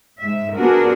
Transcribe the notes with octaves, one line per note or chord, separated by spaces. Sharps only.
G#2 E5
B3 D4 F#4 G#4 A#4